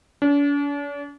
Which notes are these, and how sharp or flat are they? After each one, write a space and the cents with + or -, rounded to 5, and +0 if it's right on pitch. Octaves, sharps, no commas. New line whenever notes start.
D4 -45